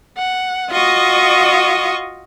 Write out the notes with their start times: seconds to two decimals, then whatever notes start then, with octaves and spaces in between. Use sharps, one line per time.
0.18 F#5
0.71 F4 F#4 D#5 C#6 D#6